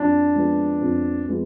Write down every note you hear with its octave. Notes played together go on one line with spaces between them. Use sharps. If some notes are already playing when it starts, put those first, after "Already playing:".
Already playing: F2 D4
F3 G#3 B3
F2
F3 G#3 B3